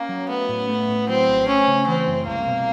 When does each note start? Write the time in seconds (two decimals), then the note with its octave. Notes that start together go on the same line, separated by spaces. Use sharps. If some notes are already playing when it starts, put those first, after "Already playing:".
Already playing: A#3 C#4
0.09 F#3
0.29 A3 B3
0.49 A2
0.69 A3
0.88 A2
1.09 F#3 C4
1.28 A#1
1.47 A3 C#4
1.68 C#3
1.87 E3 C4
2.08 F#2
2.27 C2 A#3
2.47 B2